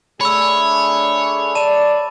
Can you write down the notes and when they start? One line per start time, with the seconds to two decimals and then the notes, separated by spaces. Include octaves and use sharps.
0.21 A3 D4 G#4 C#5 B5 E6
1.55 D5 A5 D#7 E7